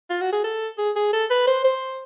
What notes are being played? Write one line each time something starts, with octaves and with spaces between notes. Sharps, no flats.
F4
F#4
G#4
A4
G#4
G#4
A4
B4
C5
C5